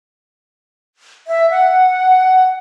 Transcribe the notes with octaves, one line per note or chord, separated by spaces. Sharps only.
E5
F#5